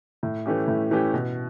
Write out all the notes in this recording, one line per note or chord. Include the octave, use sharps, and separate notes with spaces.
A2
E3 A3 C#4 G4
A2
E3 A3 C#4 G4
B2